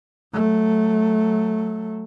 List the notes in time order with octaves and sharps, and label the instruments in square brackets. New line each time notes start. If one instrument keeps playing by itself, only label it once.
[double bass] F#3 A3